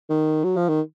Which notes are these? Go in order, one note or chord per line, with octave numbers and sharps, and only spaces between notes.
D#3
F#3
F3
D#3